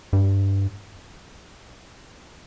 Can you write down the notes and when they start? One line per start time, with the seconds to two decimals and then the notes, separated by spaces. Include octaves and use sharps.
0.13 G2